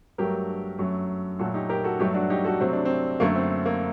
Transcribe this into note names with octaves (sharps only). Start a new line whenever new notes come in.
G2 F#3 A3 G4 A#4
F#2 F#3 A3
A#2 F#3 A3 F#4 A4
D#4 G4
G4 A#4
F#4 A4
G2 F#3 A3 D#4 G4
D4 F#4
D#4 G4
F#4 A4
C3 F#3 A3 C4
D4
C4
F#2 D3 A3 A#3
C4
A#3